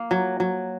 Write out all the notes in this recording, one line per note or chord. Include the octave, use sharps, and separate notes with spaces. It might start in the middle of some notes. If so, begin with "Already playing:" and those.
Already playing: A#3
F#3
F#3